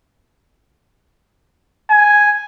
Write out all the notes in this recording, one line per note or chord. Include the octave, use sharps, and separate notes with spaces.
G#5